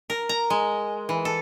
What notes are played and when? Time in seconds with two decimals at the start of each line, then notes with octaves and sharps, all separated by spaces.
0.10 A#4
0.29 A#5
0.50 G#3
1.09 E3
1.25 A4